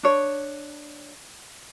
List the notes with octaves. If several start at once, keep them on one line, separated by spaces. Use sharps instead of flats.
D4 C#5